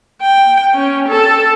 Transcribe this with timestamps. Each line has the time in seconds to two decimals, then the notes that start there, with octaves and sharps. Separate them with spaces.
0.22 G5
0.74 C#4
1.08 A4